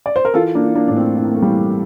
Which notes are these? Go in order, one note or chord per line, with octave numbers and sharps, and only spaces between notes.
D5
C5
A#4
E3 F4 A4
A#3 D4
E3
A#3 D4
A2 D4
A3 C4
E3 C4
A#3
A3
E3 G3 A#3